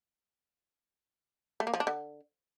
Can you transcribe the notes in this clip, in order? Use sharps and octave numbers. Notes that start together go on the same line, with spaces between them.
A3
A#3
F3
D4
D3